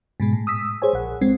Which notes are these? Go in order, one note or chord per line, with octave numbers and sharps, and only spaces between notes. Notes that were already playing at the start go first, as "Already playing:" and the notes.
G#2 B2 G#3
A2
D#6 E6 B6
G#4 C5 C#5 G#5
A#1 F#5
C2 G#3 C4